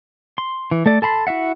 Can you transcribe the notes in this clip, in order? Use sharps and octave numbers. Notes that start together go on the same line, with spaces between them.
C6
E3
A3 A4 D5
A4 A5 B5 C6
E4 F#4 E5 F#5